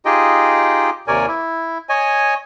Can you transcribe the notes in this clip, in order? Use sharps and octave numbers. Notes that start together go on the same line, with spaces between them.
D#4 F4 G4 G#4 D#5 G5
D#2 C3 A#4 C#5 D5 G#5
E4
C#5 D#5 G#5